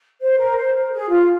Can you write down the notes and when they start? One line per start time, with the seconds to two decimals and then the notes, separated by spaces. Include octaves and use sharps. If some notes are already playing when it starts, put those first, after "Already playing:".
0.21 C5
0.38 A#4
0.56 C5
0.73 A#4
0.91 G#4
1.09 F4